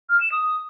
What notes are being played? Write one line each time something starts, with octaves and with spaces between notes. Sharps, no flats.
F6
E7
D#6